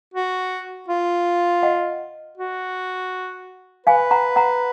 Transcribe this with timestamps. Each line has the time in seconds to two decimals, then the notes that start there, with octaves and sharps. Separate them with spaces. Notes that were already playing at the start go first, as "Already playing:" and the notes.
0.14 F#4
0.89 F4
1.63 D#5 F#5
2.38 F#4
3.87 B4 F5 G#5
4.11 F#5 A#5
4.36 F#5 A#5